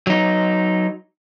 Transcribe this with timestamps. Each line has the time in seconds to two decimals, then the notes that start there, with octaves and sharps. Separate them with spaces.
0.07 F#3 D#4